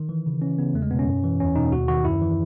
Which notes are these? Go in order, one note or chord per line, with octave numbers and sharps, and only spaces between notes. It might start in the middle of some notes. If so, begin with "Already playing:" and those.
Already playing: D#3
E3
C#3
E3 C#4
C#3 B3
E2 A3
G#3
B2 B3
C#4
F#2
E3
E2 C#4
B2 D#4
D#2 F#4
D#3 F#4
F#2 E4
E3